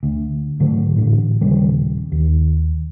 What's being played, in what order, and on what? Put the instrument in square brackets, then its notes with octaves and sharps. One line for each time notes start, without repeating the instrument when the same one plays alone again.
[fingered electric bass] D2
G#2 D3 F#3 A3
A1 A2 D3
D#1 D#2 C#3 G3
D#2